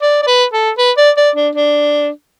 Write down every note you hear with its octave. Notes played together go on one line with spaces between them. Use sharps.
D5
D5
B4
A4
B4
D5
D5
D4
D4